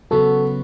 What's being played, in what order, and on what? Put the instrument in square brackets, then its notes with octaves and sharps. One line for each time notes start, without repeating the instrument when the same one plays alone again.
[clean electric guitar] C#3 F#3 B3 F#4 [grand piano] A4